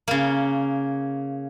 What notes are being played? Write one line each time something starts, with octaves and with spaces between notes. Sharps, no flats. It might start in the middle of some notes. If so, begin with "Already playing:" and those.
C#3 A#3